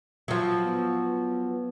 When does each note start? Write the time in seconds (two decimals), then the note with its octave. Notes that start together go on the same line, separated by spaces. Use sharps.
0.28 F3 F#3
0.64 B3